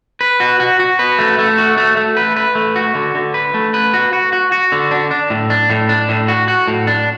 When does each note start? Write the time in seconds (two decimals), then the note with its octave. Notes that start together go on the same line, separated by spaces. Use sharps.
0.21 B4
0.40 F#4
0.60 F#4
0.80 F#4
0.99 B4
1.19 A3
1.39 A3
1.58 F#4
1.78 A3
1.97 A3
2.17 B4
2.36 B4
2.55 A3
2.76 F#4
2.95 D3
3.15 D3
3.34 B4
3.54 A3
3.74 B4
3.94 F#4
4.13 F#4
4.33 F#4
4.52 F#4
4.72 D3
4.91 D4
5.11 D4
5.30 A2
5.50 D4
5.70 A2
5.89 D4
6.09 A2
6.28 F#4
6.48 F#4
6.68 A2
6.87 D4